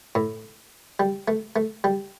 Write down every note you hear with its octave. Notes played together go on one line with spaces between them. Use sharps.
A2
G3
A3
A3
G3